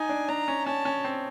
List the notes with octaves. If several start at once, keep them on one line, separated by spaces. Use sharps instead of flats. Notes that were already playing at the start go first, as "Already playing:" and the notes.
Already playing: D#4 G#5
D4
D4 A#5
C#4
C#4 A5
C#4
C4